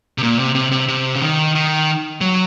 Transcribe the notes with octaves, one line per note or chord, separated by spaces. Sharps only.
C3
A#2
C3
C3
C3
C3
C#3
D#3
D#3
F#3